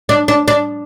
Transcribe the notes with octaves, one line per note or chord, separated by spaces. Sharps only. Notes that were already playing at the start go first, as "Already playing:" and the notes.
D4
D4
D4